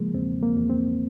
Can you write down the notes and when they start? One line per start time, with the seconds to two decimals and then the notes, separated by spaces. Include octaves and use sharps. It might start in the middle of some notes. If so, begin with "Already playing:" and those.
Already playing: C#3 F3 G#3 A#3
0.14 E2 C4
0.43 A#3
0.56 E2
0.70 C4